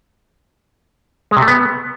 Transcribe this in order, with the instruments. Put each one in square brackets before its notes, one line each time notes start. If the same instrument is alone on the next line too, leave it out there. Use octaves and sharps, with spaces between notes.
[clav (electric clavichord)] G#3
C3
A3
B3